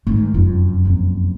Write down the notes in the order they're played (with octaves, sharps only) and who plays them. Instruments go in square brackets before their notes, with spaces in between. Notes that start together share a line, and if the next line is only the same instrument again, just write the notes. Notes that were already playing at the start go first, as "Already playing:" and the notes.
[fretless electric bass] G#2 D#3 [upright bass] A3 D#4
[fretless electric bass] F1 F#2 [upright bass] F4
[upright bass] A#1 F2